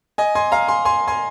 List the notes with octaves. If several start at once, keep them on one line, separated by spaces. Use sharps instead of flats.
D#5 G#5
G#5 C6
F5 A#5
G#5 C6
G#5 C6
G#5 C6